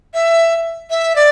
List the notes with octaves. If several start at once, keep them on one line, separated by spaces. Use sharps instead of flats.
E5
E5
D5